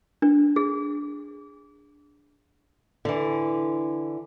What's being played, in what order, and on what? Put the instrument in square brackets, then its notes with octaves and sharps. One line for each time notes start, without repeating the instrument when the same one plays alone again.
[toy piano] D4
G#4
[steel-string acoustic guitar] D3 E3